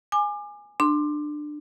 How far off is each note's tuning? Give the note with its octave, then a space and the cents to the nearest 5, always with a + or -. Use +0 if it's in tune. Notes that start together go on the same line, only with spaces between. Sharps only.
G#5 -5 D6 +30
D4 +20 C6 +0